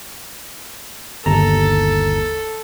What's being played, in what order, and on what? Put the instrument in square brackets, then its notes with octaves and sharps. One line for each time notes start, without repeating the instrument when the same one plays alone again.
[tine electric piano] G1 D#2 A#5 [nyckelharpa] A4